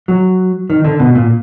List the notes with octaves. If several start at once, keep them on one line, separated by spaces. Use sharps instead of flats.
F#3
D#3
D3
B2
A#2